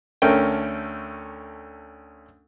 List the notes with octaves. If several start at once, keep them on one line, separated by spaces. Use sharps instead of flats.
D2 A3 C#4 A#4 G5